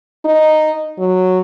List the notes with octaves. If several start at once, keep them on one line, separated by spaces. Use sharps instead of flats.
D#4
F#3